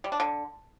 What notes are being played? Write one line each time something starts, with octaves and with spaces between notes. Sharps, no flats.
G3
D4
D3